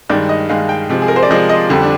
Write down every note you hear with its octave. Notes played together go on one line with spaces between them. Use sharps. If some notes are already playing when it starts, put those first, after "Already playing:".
G2 D#3 G#3 D5
D#5
G2 D#3 G#3 F5
G5
C3 F3 G#3
G#4
A#4
C5
D5
C3 F3 G#3 D#5
D#5
F2 D3 G3
D4